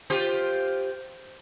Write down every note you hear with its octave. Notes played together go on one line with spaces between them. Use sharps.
F4 G4 C5